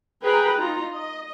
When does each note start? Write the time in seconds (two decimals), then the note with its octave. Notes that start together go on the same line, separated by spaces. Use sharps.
0.22 G#4 B4 G5 A#5
0.59 D#4 F4 A#5
0.92 D#5